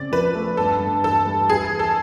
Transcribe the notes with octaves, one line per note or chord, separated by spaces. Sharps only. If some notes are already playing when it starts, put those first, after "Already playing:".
Already playing: C#3 C4 D5
F3 B4
A3
G2 A4
G2
E3 A4
G3
E3 G#4
E3
A4